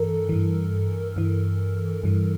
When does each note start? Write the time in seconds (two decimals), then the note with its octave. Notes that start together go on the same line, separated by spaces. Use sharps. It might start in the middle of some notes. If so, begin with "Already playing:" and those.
Already playing: G2 E3 A4 A#4
0.29 G2 E3
1.16 G2 E3
2.04 G2 E3